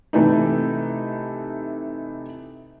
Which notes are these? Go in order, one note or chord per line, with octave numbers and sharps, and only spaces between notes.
C3 E3 A3 D#4